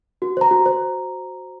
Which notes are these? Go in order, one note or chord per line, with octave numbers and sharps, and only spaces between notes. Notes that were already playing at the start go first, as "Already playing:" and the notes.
F#4
C5 A#5
F#4
C5